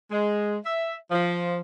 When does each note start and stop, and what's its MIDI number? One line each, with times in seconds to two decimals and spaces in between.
0.11 0.56 56
0.65 0.93 76
1.11 1.60 53